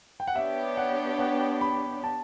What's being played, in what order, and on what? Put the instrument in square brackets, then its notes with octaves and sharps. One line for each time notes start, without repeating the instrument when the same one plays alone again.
[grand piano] G5
F#5
[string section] B3 D4 G4 C#5 [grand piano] E5
[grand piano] F#5
F#5
B5
A5